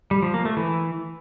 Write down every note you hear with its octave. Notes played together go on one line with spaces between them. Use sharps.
G3
F3
A#3
A3
E3